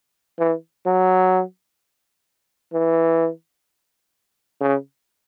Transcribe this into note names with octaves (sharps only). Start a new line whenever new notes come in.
E3
F#3
E3
C#3